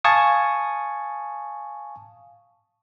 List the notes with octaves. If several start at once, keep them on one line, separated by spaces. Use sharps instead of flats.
F5 G#5 A5 C#6 D#6